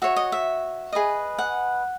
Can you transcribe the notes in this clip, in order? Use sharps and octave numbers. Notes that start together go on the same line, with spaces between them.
F#4 C#5 E5
D#5
E5
G#4 B4 D#5
F#5